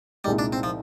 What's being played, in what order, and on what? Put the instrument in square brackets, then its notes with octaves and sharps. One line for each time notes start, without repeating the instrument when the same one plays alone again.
[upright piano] C2 A#2 G#3 D#4 [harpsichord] G3
[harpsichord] D4
C4
F3